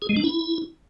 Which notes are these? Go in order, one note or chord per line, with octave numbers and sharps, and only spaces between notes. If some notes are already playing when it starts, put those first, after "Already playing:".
G#4
G#3
D4
E4